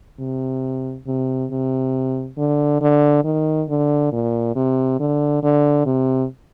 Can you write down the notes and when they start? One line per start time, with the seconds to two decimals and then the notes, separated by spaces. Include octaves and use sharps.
0.20 C3
1.07 C3
1.51 C3
2.38 D3
2.82 D3
3.25 D#3
3.69 D3
4.12 A#2
4.56 C3
5.00 D3
5.43 D3
5.86 C3